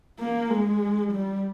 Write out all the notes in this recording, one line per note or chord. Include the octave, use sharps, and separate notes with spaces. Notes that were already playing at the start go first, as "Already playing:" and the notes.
A#3
G#3
G3